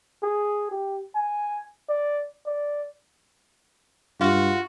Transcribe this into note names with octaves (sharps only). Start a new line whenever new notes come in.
G#4
G4
G#5
D5
D5
G2 F4 F#4